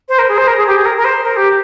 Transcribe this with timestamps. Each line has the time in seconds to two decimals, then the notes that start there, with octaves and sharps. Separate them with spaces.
0.09 C5
0.19 A#4
0.28 G#4
0.38 C5
0.47 A#4
0.57 G#4
0.67 G4
0.77 G#4
0.85 A#4
0.97 A#4
1.05 C5
1.24 A#4
1.36 G4